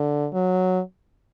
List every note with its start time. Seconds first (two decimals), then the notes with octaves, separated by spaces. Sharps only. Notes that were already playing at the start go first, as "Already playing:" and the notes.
Already playing: D3
0.33 F#3